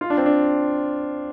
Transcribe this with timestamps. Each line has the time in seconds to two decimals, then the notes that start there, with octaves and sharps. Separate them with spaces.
0.01 F4
0.10 D4
0.17 C4
0.26 D4